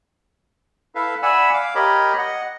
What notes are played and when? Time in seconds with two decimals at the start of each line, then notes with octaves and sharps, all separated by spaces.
0.95 E4 A4 B4 E5 F5
1.22 D5 E5 F#5 G#5 B5 E6
1.54 F5 D6
1.75 G4 A#4 C#5 D#5 B5
2.18 D#5 F#5